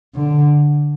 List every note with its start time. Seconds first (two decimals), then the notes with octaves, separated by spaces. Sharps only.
0.15 D3